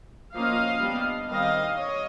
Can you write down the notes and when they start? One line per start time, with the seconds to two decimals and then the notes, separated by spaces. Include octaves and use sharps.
0.34 F3 A#3 C#4 D#5 F5
0.82 G3 B3 D4
1.30 D#3 G3 C4 D#5 F5
1.78 C#5 D#5